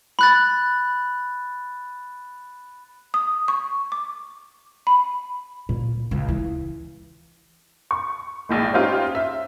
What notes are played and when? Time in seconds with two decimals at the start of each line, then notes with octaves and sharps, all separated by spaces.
0.19 B5 F#6 A6
3.14 D#6
3.48 C#6
3.92 D6
4.87 B5
5.69 A#2
6.11 C#2
6.28 E3
7.91 C#6
8.49 A#1 A2 G#3
8.73 C#4 D#4 F4 G4 C5 C#5
9.15 E5